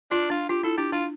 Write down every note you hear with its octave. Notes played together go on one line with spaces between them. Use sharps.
D4 F4
D4 F4
F4 G4
E4 A4
D4 G4
D4 F4